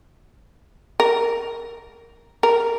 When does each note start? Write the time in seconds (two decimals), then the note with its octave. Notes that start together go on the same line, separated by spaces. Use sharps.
1.00 A#4
2.43 A#4